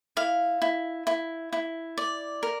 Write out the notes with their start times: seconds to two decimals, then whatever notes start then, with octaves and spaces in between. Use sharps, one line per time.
0.17 E4 F5
0.62 E4
1.07 E4
1.53 E4
1.98 D5
2.43 A#4